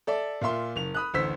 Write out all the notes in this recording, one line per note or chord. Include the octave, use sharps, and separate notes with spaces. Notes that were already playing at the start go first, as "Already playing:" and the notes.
A4 D5 E5
A#2 F4 E5 C6
F#1 F7
B5 D#6 F#6
A1 D2 C5 E6 B6